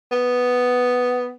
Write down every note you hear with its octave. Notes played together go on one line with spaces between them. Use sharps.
B3